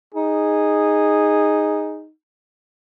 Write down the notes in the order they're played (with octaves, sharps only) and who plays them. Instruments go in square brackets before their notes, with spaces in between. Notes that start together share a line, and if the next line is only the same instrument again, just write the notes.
[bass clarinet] D#4 [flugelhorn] G#4